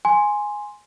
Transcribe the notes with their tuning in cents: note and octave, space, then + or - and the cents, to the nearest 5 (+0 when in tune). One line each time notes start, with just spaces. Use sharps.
G#5 +0 C6 +0